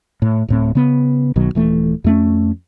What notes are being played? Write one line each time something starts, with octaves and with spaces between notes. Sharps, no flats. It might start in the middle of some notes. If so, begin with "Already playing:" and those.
A2
D1 A2 C4
C#3 B3
B1 B2 D#3 F#3
D#1 E3 A3
F2 A3 C#4